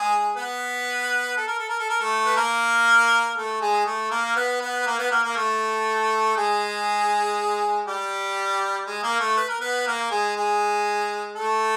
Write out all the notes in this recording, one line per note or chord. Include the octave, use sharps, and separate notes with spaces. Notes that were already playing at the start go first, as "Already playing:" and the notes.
Already playing: G#3 G#4
B3 B4
A4
A#4
A4
A#4
A4
A#4
A3 A4
B4
A#3 A#4
A3 A4
G#3 G#4
A3 A4
A#3 A#4
B3 B4
B3 B4
B4
A#3 A#4
B3 B4
A#3 A#4
A#3 A#4
A3 A4
G#3 G#4
G3 G4
G#3 G#4
A#3 A#4
A3 A4
B4
A#4
B3 B4
A#3 A#4
G#3 G#4
G#3 G#4
A3 A4